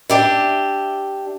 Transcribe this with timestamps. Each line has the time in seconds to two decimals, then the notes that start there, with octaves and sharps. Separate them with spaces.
0.10 D4 G4 E5